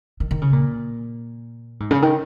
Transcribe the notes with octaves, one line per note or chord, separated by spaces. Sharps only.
D#3
D#3
C#3
A#2
G#2
C#3
D#3